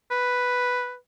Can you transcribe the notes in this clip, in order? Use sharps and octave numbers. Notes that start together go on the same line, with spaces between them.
B4